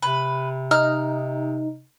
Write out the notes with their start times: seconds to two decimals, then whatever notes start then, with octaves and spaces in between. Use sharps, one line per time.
0.02 C3 B4
0.71 D#4 F6